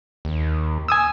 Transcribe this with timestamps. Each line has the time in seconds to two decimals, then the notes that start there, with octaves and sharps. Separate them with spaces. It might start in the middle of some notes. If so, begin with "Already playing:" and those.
0.25 D#2
0.88 G#5 D#6 E6